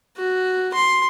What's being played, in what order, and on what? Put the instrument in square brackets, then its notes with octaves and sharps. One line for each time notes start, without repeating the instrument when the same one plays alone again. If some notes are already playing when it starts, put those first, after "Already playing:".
[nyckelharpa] F#4
C6